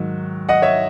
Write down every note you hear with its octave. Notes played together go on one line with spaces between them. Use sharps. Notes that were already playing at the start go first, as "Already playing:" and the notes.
Already playing: G#2 D#3 F#3
D#5 F#5
C#5 E5